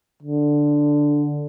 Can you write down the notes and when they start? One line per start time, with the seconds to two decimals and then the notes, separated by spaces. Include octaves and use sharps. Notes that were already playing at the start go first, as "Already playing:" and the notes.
0.23 D3